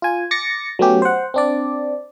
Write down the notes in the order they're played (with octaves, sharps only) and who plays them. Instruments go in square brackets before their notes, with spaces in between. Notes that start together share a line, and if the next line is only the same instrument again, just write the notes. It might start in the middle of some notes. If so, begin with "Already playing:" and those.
[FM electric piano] F4 G#5
D6 A6 A#6 C#7
F#3 A3 B3 C#4 G4
C5 F#5
C4 D4 D5